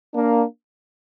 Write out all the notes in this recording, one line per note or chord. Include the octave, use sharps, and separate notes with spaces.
A#3 D4